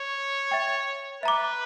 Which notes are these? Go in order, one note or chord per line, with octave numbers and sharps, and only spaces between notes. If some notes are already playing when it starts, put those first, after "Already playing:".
Already playing: C#5
E5 G5 C#6
B4 E5 A#5 D6